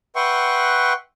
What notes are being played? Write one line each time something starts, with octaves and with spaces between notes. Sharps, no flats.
B4 E5 F#5 G5 C6 C#6